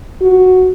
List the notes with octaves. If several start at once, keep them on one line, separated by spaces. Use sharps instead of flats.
F#4